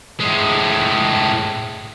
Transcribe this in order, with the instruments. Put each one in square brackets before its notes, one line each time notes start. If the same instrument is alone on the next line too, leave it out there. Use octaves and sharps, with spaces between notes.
[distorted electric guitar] A2 G#3